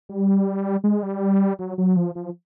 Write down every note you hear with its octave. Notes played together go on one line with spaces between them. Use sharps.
G3
G#3
G3
F#3
F#3
F3
F3